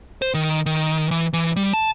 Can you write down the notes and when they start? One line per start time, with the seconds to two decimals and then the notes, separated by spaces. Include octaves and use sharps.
0.22 C5
0.34 D#3
0.66 D#3
1.11 E3
1.33 E3
1.56 G3
1.74 A5